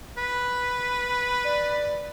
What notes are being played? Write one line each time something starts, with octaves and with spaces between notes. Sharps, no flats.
B4
D5